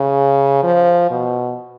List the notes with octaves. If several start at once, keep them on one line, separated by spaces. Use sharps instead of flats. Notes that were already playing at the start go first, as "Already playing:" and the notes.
Already playing: C#3
F3
B2